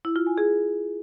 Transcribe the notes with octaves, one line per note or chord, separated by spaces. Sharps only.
E4
F4
G#5
G#4